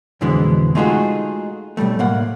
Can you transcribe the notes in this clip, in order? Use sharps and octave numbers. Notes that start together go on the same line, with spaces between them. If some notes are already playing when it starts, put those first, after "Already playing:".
F2 B2 D3 E3 G#3 B3
G#3 A3 D#4 F4 F#4 G#4
B1 F2 G3 A3
A2 A#3 F#5